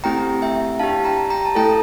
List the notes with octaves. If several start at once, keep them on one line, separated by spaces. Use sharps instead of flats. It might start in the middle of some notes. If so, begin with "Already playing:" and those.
A3 C4 E4 G4 G5 A#5
E5 G5
D4 G4 F5 A5
G5 A#5
G5 A#5
A5
A3 E4 A4 G5 A#5